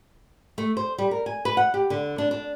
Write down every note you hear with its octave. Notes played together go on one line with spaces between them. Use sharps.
A3
C5
G3
A#4
G#5
B4
F#5
G4
D3
D4
D4